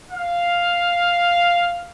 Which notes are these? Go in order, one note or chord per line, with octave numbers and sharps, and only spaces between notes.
F5